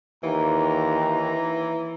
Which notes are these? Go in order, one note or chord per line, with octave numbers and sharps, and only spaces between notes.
D#2 E3 A#5